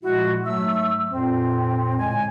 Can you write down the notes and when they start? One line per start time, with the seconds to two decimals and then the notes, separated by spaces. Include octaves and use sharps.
0.03 A#2 F3 G#3 E4 F#4
0.46 G#2 F#3 A3 E5 E6
1.11 F2 A#2 C4
1.99 A2 D3 G#3 G#5